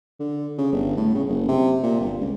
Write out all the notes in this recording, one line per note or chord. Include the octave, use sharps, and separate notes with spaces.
D3
C#3
G1
A2
C#3
F#1
C3
A#2
G1
C#2